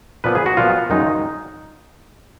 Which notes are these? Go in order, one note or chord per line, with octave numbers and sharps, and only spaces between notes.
A#2 F3 B3 B4
G#4
F#4
A#2 F3 B3 F4
F#2 D#3 G#3 D#4